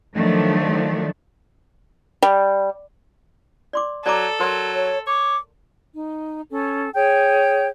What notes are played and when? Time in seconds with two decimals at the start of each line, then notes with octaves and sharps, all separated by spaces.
0.15 D#3 F3 F#3 A3 D4
2.22 G3
3.73 D5 C6 D6
4.06 F#3 A4 D5 A#5 D6
4.40 F#3 A#4 C6
4.75 C#5
5.07 C#5 D6
5.94 D#4
6.50 C#4 A4
6.95 G#4 C#5 G5 G6